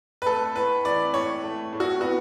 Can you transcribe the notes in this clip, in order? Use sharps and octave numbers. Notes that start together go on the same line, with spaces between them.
B4
A3 A4
A2 B4
E3 D5
A2 C#5
A3
A2
F#4
B3 F#4